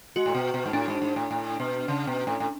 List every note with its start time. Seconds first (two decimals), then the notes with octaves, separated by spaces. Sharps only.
0.16 G#3 F#4
0.26 A2
0.35 B2
0.54 B2
0.66 G#2
0.73 A2 D4
0.88 G#2
1.02 G#2
1.16 A2
1.31 A2
1.60 B2
1.88 C#3
2.07 B2
2.27 A2
2.40 A2